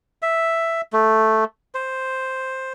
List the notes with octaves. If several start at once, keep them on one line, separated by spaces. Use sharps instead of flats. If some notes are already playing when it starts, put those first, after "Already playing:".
E5
A3
C5